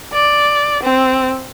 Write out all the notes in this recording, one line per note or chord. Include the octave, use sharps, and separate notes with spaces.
D5
C4